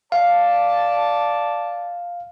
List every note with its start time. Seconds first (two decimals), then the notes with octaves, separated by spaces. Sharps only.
0.12 D5 F5 A5